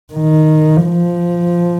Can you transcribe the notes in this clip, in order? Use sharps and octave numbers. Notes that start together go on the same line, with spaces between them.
D#3
F3